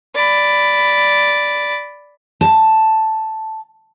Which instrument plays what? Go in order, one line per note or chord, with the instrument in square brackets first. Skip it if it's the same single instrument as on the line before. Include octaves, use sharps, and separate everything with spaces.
[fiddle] D5 B5
[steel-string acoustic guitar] A5